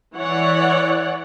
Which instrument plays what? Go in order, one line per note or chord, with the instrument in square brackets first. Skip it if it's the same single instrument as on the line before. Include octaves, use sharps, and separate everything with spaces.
[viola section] E3 C#5 D5 F#5